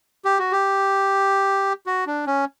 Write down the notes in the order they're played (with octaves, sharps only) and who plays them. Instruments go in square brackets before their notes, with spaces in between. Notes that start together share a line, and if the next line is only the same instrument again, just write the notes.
[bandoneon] G4
F#4
G4
F#4
D4
C#4